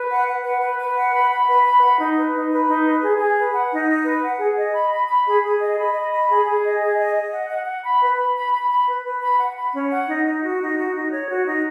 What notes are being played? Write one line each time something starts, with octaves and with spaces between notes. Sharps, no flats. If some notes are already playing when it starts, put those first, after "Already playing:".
Already playing: B4
F#5
F#5
B4
B4
B4
F#5
B5
B5
B4
B5
F#5
D#4
B4
D#4
B4
D#4
B4
G#4
G#4
B4
F#5
D#4
D#4
B4
F#5
G#4
D#5
B5
B5
B5
G#4
G#4
D#5
B5
D#5
B5
G#4
G#4
D#5
G#4
D#5
D#5
F#5
F#5
F#5
B5
B4
B5
B5
B5
B5
B4
B4
B5
F#5
B5
C#4
F#5
D#4
D#4
F#4
D#4
F#4
D#4
C#5
F#4
D#4